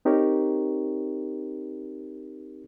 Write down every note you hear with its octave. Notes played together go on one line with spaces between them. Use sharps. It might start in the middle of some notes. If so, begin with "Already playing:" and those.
C4 D#4 G4 A#4 C#5